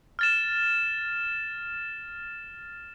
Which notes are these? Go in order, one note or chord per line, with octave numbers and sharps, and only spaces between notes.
F6 A6 E7